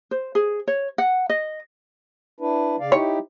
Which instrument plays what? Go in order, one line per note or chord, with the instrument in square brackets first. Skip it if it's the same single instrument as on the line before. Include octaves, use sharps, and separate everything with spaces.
[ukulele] C5
G#4
C#5
F#5
D#5
[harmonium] D4 E4 B4
C#3 D5 F5
[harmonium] D#4 E4 G4 [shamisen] C#5